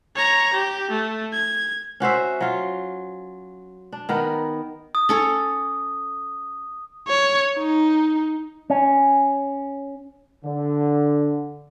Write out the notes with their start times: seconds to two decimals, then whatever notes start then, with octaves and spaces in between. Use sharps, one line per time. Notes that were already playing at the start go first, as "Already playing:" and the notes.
0.15 C#5 A#5
0.53 G4
0.90 A3
1.33 G#6
2.00 C#4 F#4 C5 E5
2.41 F#3 F4
3.92 D4
4.09 D#3 B3 A#4
4.95 D#6
5.09 C#4 A4 C#5
7.08 C#5
7.57 D#4
8.70 C#4
10.45 D3